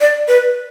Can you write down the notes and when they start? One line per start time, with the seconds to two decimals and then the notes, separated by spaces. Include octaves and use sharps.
0.01 D5
0.28 B4